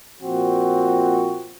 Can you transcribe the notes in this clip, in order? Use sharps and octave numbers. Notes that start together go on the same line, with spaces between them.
A#2 F3 C4 F#4